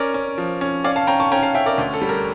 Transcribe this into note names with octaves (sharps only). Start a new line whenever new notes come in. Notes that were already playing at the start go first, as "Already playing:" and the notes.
Already playing: C#4 A#4 D5
C#4
F3
C#4
C#4 D5 F5
F5 A5
C#4 G5 A#5
A5 C#6
C#4 G5 A#5
F5 A5
C#4 E5 G5
A#4 D5
D2
A4
G3
A#4